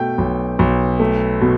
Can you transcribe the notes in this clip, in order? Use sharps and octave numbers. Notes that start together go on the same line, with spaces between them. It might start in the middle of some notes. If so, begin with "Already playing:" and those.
Already playing: B2 A3 G5
B1
B1
A3
B2